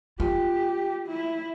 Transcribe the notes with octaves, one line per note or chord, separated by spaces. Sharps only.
F4 G4
E4